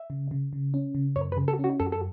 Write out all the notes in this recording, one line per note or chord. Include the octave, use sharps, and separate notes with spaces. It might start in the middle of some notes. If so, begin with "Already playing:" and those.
Already playing: E5
C#3
C#3
C#3
C#4
C#3
F#2 C#5
B4
C#3
A4
C#4 F#4
F#2 A4
A4